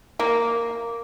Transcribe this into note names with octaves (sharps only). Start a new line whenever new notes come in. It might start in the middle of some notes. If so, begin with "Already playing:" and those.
A#3